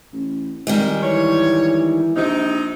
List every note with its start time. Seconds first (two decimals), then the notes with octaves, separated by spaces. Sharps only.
0.13 A1
0.67 F2 D#3 G3 G#3
1.03 E3 C#5
2.15 A#1 C3 D#4